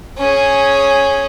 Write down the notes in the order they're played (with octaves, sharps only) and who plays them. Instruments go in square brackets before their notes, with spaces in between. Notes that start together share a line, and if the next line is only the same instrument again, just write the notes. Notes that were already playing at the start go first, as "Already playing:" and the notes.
[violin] C#4 G#4